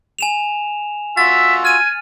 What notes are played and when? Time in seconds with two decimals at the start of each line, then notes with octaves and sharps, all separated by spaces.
0.19 G#5 E7 F7
1.17 F4 F#4 E5 E6 A6
1.65 G#5 F6 D#7